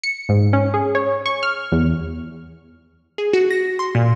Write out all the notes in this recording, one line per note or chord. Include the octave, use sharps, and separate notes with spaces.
C#7
G#2
C#4
G#4
C#5
C#6
F6
E2
G#4
F#4
A#6
C6
A#2